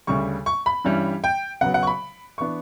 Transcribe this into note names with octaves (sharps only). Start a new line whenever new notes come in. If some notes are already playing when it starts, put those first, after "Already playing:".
D2 C#3 G3 C#6
C#6
B5
G2 E3 G3 C#4
G5
C#3 F#3 B3 F#5
F#5
C#6
B5
E3 B3 D4 C#6